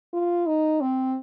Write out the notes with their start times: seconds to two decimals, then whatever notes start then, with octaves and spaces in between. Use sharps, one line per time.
0.13 F4
0.47 D#4
0.81 C4